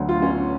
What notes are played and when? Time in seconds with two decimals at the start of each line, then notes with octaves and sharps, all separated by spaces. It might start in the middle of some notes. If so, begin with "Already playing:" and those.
Already playing: D2 D3 F#3 B3
0.09 F4
0.22 C#4